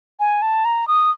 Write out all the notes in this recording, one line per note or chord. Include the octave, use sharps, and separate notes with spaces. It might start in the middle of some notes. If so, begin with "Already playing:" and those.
G#5
A5
A#5
D#6